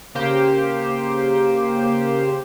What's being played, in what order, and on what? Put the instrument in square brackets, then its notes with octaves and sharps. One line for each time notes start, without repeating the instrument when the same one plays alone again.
[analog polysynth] C#3 A#3 G4 C5